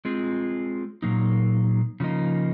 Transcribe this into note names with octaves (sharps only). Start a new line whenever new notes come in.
G#3 C4 F4 G#4
A#2 F#3 A#3 D#4
C#3 F3 A#3 D#4